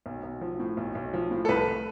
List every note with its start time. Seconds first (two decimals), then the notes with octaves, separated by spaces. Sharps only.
0.06 B1
0.23 B1
0.41 F3
0.59 A2
0.77 B1
0.95 B1
1.13 F3
1.31 A2
1.45 A4
1.49 C2 B4
1.67 A3